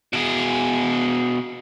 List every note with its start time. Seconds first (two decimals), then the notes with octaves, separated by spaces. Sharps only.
0.13 B2 G#4